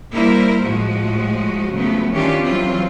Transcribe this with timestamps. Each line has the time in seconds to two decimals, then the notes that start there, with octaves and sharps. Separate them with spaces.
0.12 G3 A#3 E4 A#4 C5
0.62 A2 F3 G#3 F#4
1.72 C#3 F3 F#3 A3 B3
2.11 D#3 E3 C#4 D4 F4 G4
2.42 E3 F#3 C4 F4